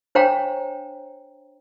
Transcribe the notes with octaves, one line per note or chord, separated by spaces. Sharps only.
D4 C5 C#5 F5 G5 A#5